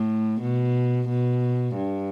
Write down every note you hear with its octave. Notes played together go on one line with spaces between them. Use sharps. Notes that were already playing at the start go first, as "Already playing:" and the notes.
Already playing: A2
B2
B2
G2